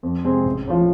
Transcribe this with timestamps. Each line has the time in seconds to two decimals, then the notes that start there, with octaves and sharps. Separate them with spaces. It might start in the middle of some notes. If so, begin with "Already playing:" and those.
0.03 F2
0.25 C3 G#3 C4 G#4
0.45 A1
0.67 A2 F3